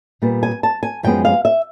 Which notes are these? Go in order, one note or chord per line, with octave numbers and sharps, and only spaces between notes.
A#2 G3 B3
G#5
A5
G#5
F#2 C#3 F3 G#3 B3 G5
F5
E5